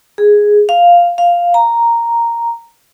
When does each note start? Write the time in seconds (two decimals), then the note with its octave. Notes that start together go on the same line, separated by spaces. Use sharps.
0.18 G#4
0.69 F5
1.18 F5
1.54 A#5